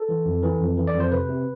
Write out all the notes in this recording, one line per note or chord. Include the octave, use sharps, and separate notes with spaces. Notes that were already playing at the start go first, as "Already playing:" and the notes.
Already playing: A4
E3
F2
E3
F2
E3
D5
F2
C5
C3 B4
C3